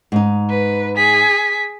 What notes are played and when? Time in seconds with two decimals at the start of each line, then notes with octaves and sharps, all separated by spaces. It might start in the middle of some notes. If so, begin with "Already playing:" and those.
0.12 G#2 D#4
0.49 B4
0.97 G#4 B6